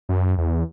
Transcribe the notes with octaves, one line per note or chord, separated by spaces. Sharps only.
F#2
E2